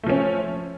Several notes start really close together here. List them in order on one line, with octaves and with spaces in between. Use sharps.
A3 F3 C#4